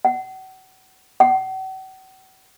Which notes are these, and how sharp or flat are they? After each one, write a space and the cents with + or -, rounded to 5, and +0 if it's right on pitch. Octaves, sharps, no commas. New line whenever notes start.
F#5 +35
F#5 +45